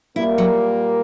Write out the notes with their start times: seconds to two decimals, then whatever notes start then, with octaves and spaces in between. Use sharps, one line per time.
0.16 A#2 G3 A#3 E4
0.38 F#3